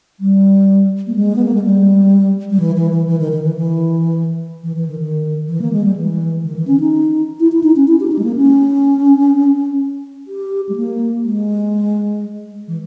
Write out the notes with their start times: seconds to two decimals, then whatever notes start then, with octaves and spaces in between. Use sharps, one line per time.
0.20 G3
1.07 A#3
1.16 G#3
1.36 B3
1.45 A#3
1.54 G#3
1.63 G3
2.50 G3
2.60 E3
2.76 E3
2.91 E3
3.07 E3
3.20 D#3
3.31 D#3
3.43 E3
3.56 E3
4.63 E3
4.76 E3
4.88 D#3
5.00 D#3
5.48 E3
5.62 A#3
5.72 G#3
5.84 G3
5.96 E3
6.44 D#3
6.56 E3
6.67 C#4
6.80 D#4
7.40 E4
7.52 E4
7.63 D#4
7.76 C#4
7.88 E4
8.00 G4
8.07 C#4
8.12 D#4
8.19 G#3
8.24 A#3
8.36 C#4
10.27 G4
10.69 G#3
10.76 A#3
11.24 G#3
12.68 E3